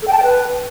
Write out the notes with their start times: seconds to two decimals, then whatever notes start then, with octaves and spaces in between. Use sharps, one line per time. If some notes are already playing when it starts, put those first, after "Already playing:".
0.02 A4
0.08 G5
0.13 A5
0.18 G5
0.23 B4